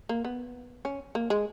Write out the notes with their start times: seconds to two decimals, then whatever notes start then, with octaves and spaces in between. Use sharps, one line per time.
0.09 A#3
0.25 B3
0.85 C#4
1.15 A#3
1.30 G#3